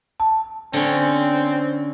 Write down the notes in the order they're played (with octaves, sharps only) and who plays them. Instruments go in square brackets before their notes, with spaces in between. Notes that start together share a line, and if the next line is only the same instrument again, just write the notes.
[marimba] A5
[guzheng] D3 C#4 [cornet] C4